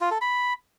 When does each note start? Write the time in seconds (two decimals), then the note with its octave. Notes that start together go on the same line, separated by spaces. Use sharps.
0.01 F4
0.11 A4
0.21 B5